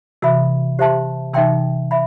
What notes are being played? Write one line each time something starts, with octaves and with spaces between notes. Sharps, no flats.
C3 E3 F#4 A4 E5 B5
G4 C5 E5 A5 C6
C3 E3 D#4 A4 E5 G5 C6
E5 B5